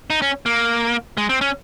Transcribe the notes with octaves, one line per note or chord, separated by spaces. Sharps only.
D#4
C#4
A#3
G#3
C4
C#4